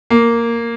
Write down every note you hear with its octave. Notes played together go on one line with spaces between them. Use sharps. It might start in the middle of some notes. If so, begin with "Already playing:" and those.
A#3